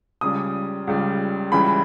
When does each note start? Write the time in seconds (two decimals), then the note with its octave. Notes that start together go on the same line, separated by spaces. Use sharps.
0.21 C#2 C#3 G3 D#6
0.87 C#2 C#3 G3
1.52 C#2 C#3 E3 G3 B5